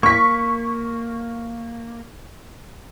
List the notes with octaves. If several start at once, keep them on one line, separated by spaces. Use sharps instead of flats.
A#3 C#6 B6